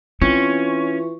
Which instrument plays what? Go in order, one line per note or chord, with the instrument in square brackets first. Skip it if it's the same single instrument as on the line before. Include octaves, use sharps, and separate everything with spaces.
[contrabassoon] E3 [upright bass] C4 [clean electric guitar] C#4 [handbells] F4 C#6